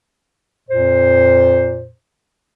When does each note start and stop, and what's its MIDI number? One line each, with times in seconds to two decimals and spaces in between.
0.69 1.90 41
0.69 1.90 46
0.69 1.90 72